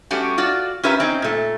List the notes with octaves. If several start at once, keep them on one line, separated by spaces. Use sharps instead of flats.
G3 A3 C#4 F#4 G4
F4 F#4 D5
C#4 F4 G4 A#4 B4 E5
C4 C#4 D#4
A#2 A3